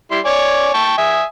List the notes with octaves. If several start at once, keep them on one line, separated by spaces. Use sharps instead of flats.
G3 E4 C6
C#5 D5 G#5
G5 A5 C#6
E5 G#5 D#6